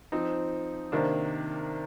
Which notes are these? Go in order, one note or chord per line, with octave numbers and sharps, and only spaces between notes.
F3 C4 D#4
C3 D#3 A#3 D4